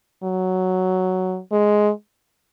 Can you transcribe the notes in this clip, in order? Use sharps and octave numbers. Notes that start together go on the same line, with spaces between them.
F#3
G#3